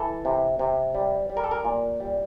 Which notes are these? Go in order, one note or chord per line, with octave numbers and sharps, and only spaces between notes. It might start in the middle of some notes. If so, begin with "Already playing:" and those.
Already playing: E3 A4
C3
C3
G3
G3
A#4
A4
A#4
A#2
G3